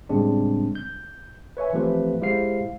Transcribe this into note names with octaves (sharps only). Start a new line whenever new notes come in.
A2 C#3 G3 G#3 C4 D4
G6
B4 C#5 E5 G#5
E3 F3 A3 C4 G4 B4
G#3 E4 G4 C5 F5 C7